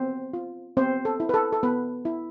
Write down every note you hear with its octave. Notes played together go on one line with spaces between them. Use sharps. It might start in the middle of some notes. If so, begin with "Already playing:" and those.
Already playing: B3 C4 C5
F4
B3 C4 C5
A4
E4
B4
A4
A4
B3 B4
E4